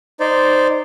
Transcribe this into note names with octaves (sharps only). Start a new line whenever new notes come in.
D#4 C5 D5